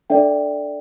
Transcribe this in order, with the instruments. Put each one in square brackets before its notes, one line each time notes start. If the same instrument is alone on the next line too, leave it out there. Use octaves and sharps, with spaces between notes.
[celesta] D4 A4 D5 E5 G5